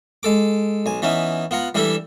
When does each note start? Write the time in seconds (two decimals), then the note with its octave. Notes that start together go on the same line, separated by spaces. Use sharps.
0.23 G#3 A4 D6
0.86 B1 G#5
1.02 E3 B3 C#4 D#4 E4
1.51 B3 F4 F#5 A#5
1.75 E3 G3 D4 E4 G4 A4